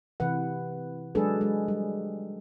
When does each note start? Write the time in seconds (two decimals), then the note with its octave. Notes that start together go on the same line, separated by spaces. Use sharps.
0.20 C3 E3 B4 F#5
1.15 F#3 G#3 D4 G#4 A4 B4
1.41 G#3
1.68 G3